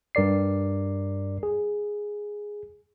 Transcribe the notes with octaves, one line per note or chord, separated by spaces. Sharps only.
G2 A#4 D5 C7
G#4